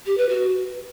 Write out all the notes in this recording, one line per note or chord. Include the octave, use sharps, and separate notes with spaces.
G4
B4
F#4